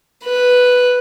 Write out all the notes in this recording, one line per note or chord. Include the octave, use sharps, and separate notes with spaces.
B4